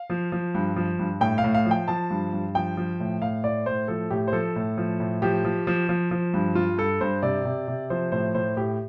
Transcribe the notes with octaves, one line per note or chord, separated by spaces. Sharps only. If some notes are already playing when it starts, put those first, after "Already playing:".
Already playing: F5
F3
F3
G2
F3
G2
A2 G5
F5
A2
F5
F3
G5
F3 A5
G2
G2
F3 G5
F3
A2
A2 F5
A2 D5
A2 C5
F3 A4
A2 G4
C5
F3 A4
A2
F3
A2
F3 G4
F3
F3
F3
F3
G2
G2 F4
G2 A4
G2 C5
C3 D5
C3
C3
F3 C5
A2 C5
A2 C5
A2 G4